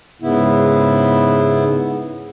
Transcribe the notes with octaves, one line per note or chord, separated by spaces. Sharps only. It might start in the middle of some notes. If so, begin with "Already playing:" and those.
G#2 C#3 B3 E4